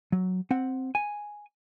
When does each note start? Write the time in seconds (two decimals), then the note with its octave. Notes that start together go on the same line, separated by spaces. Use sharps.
0.12 F#3
0.51 C4 F#5
0.95 G#5